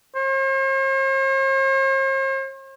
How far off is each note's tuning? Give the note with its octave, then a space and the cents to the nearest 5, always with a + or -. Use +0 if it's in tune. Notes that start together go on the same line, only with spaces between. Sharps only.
C5 +45